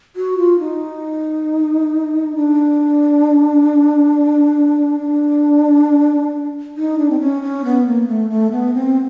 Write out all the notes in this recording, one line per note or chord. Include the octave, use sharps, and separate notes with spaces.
F#4
F4
D#4
D4
D4
D#4
D4
C4
C#4
C#4
B3
A#3
A3
A3
B3
C4